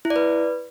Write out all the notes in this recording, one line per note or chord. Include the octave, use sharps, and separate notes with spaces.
E4
D5
B4